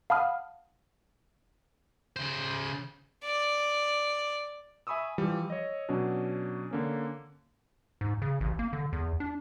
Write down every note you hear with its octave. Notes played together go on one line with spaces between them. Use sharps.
F5 F#5 A5 B5 D#6 F6
C#3 C5
D5
E5 G#5 B5 C#6 D#6 E6
E3 F3 G3
C#5 D#5
B2 F#3 C#4 D4
D3 A#3 C#4
G#2
C#3
A1
A#3
D3
E2
D4